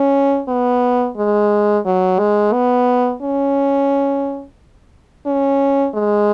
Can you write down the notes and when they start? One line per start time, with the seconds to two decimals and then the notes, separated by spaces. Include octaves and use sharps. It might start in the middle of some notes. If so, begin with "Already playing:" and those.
Already playing: C#4
0.48 B3
1.17 G#3
1.85 F#3
2.19 G#3
2.53 B3
3.22 C#4
5.26 C#4
5.94 G#3